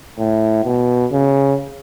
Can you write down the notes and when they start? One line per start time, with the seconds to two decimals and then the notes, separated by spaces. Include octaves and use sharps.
0.18 A2
0.64 B2
1.12 C#3